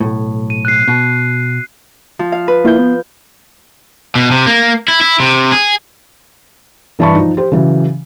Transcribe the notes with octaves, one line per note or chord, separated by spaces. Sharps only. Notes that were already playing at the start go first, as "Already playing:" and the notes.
B1 A2
D#7
F#6 C7
B2
F3
F5
B4
A#3 E4 F4 G6
B3
B2
C3
A#3
E4
E4
C3
G#4
G2 E3 D5 A5 B5 C#6
F3 D#4
G4 C5
C#3 E3 F#3